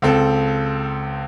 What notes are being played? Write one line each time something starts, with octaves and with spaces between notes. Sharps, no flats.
C#2 C4 A4